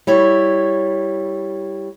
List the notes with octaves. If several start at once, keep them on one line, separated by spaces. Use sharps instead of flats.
G3 E4 C#5